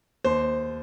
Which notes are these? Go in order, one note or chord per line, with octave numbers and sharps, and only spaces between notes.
D#2 C5